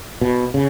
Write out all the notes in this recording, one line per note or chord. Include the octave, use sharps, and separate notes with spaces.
B2
C#3